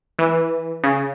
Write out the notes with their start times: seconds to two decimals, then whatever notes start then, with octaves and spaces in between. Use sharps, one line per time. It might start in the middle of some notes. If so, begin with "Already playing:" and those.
0.19 E3
0.84 C#3